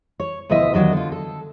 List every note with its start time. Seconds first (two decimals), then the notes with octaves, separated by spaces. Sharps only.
0.20 C#5
0.49 D2 B2 F3 E4 D#5 E5
0.73 D#2 B2 F#3 D4 D#5
0.92 D3 F4
1.12 A4